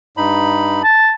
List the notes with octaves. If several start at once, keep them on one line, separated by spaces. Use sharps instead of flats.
G2 D#4 B5
A5